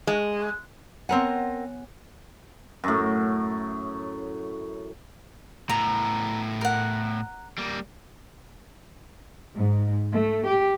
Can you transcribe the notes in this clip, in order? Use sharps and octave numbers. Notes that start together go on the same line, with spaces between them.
G#3
B3 C4 A#4 C#5 F#5 G#5
F#2 A2
A2 B3 A#5
A#4 F#5
G3 A#3
G#2
A3
G4